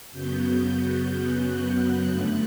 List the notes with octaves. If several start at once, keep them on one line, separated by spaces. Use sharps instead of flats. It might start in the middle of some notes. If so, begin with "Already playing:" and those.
F#2 C#3 F#3 B3 G6
F#6
G2 D3 A3